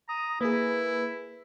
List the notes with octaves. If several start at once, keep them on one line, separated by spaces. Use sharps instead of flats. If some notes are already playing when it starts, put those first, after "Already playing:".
A#5 D#6
A#3 E4 G#4 B4